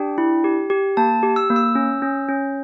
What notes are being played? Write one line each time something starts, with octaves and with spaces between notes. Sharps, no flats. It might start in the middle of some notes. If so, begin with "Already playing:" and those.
Already playing: D4 G4 G5
E4
G4
G4
A#3 A5
G4
E6
A#3
E6
C#4
C#4
C#4